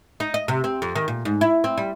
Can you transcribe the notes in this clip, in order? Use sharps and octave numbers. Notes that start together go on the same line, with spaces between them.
D#4
D#5
C3
C4
F2
D#3
A#2
G#2
E4
C4
G3